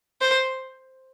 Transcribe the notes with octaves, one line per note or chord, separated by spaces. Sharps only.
C5